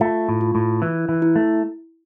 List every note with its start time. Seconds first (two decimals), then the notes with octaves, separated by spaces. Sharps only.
0.01 A3 F4
0.29 A2
0.41 F4
0.55 A2
0.82 E3 E4
1.09 E3
1.22 E4
1.36 A3